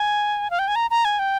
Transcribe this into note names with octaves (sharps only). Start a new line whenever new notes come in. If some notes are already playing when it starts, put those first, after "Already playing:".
Already playing: G#5
F5
G5
G#5
A#5
A#5
G#5
G5